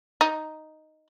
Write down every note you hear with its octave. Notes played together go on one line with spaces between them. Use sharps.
D#4